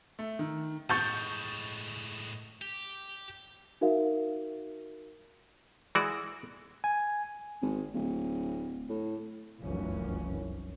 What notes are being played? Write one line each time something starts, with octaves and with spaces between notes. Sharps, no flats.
A3
D#3
A2 G#3 C#6 G6 A6
G4
D#4 F#4 A#4 E5 F5
E3 G#3 F#4 D5
G#5
G#1
D1
A2
F1 C2 F#2 E3 F3 C#4